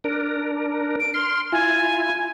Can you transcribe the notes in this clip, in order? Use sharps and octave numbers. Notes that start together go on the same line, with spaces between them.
D4 A#4
D7
C6 F6
E4 F4 G#5